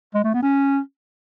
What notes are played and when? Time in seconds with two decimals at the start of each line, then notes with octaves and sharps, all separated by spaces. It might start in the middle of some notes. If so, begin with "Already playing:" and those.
0.15 G#3
0.24 A3
0.34 B3
0.43 C#4